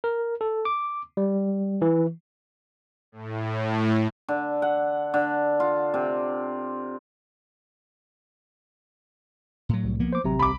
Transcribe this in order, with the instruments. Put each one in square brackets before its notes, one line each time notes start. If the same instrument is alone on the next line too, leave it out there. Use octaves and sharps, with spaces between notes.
[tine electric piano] A#4
A4
D6
G3
E3
[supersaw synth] A2
[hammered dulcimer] D3
F#5
D3
F4
C3
[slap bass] A2 F#3
[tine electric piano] C2
[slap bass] F3 A#3 B3
[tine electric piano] C5 D6
[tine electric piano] A1 C3 A#5 [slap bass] F#3
[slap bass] C2 [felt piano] B5 D6